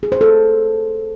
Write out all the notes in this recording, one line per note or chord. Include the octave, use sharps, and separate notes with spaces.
G#4
C5
A4